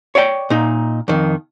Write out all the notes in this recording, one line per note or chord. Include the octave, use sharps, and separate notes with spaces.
C#5 D5 F5 G5
A#2 D#4
F2 D#3